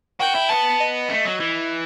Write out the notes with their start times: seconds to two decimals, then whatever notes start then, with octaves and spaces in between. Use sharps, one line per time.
0.20 F#4 G5
0.35 E4
0.49 B3 A5
0.79 D#5
1.10 A3
1.25 F#3
1.40 E3